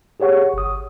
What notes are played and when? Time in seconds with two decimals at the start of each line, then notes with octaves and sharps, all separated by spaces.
0.20 G4 G#4 C#5 F#5 C#6
0.54 G1 D#6